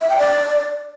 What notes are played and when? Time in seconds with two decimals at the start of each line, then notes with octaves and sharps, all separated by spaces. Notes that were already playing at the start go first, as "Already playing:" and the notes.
0.01 E5
0.10 G5
0.18 D5